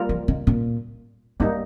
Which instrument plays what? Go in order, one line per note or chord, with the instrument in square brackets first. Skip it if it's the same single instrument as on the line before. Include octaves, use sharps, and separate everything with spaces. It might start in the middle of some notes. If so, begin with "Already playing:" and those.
Already playing: [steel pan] G3 A#3 F4 A#4
[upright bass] F3
D#3
A#2
[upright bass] G2 [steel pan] G3 A#3 D#4